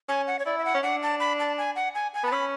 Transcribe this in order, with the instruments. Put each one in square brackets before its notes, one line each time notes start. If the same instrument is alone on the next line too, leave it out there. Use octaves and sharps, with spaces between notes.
[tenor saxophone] C#4 [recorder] G#5
[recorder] F#5
C#5
[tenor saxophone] E4 [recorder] D5
[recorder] E5
F#5
[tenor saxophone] C#4
[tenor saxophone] D4 [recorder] F#5
[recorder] A5
B5
A5
G#5
F#5
G#5
G#5
[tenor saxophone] B3 [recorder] A5
[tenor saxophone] C#4 [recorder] B5